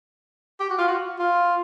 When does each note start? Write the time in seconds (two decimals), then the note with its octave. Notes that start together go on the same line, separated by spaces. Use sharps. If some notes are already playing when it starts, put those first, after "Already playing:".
0.60 G4
0.70 F#4
0.78 F4
0.88 F#4
1.19 F4